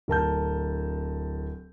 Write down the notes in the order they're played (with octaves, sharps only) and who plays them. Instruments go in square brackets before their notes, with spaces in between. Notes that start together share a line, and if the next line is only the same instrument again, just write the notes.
[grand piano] D1 A#4 A5 G6